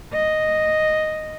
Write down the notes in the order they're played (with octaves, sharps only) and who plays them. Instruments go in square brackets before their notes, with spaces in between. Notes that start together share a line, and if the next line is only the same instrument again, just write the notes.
[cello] D#5